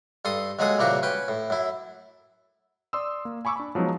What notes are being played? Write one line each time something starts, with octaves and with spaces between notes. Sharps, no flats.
G2 A4 C6 D#6
D#2 F#3 G#3 G#4 A4 D#6
C2 A#2 C#3 E3 F#4 G4
C#4 B4 G5
A2
F#2 E4
D5 C6 D#6 E6
A#3
G#5 B5 C#6 D6 E6
D4 B5
F3 F#3 G#3 B3 D#4